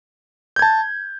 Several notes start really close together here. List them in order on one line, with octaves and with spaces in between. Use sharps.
G6 G#6 A5